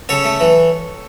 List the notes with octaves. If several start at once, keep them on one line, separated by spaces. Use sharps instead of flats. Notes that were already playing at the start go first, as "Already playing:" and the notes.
C#3 A4 C#5
A3
E3